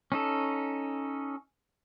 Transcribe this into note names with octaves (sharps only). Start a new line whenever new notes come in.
C#4 D#4 A4